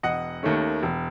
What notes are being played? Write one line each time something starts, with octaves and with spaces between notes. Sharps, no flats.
E1 D#5 F#5
D#2 D#3 A3 C#4
E1